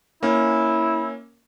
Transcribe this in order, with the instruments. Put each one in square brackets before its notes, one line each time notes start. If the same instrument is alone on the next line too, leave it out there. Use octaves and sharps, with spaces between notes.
[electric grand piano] A#3 C#4 [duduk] E4